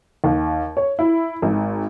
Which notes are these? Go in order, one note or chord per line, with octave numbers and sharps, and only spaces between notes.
D#2
C#5
E4
G#1